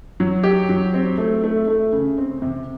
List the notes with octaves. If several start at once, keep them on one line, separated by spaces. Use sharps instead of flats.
F#3
G4
F#3
C4
A3
A3
A3
C#3
C4
C3